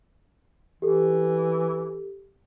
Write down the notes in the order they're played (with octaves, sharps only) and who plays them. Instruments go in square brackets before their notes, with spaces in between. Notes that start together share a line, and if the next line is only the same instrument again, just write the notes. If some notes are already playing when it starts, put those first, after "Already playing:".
[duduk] E3 [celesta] G4 A4